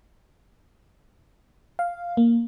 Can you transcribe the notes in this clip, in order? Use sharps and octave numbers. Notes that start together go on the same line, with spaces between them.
F5
A#3